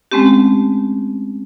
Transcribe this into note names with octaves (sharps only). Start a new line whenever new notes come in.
G#3 A3 C4 C#4 G4